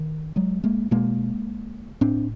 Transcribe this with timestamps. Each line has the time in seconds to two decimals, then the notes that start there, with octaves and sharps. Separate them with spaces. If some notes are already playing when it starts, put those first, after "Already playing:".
Already playing: D#3
0.36 F#3 G#3
0.64 G#3 A#3
0.91 B2 G#3 A#3
2.01 A2 C4 D4